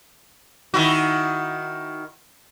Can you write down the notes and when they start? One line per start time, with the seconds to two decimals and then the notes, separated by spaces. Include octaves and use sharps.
0.74 D#3 E4 F#4